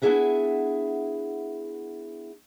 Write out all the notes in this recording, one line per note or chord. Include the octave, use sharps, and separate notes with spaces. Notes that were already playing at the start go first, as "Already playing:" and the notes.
B3 D4 E4 G#4 E5 F#5